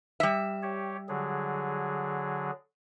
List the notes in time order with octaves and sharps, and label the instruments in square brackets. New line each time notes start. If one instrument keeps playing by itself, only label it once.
[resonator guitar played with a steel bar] G3 E5
[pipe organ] G4 C#5
D3 F#3 G#4